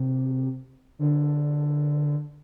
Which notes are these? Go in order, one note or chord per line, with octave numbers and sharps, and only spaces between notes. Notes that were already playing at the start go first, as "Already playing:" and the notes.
Already playing: C3
D3